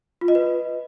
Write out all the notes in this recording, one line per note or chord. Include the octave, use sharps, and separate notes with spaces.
F4
D#5
B4